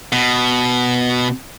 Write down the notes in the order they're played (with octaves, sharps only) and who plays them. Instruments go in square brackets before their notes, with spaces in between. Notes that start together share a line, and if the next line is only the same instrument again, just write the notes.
[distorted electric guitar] B2